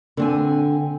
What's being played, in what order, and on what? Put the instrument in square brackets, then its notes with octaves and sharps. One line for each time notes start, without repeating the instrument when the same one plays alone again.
[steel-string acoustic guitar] D3 C4 G#5